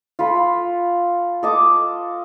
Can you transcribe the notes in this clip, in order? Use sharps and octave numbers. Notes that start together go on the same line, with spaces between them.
F4 A4 B5
A4 D#5 D6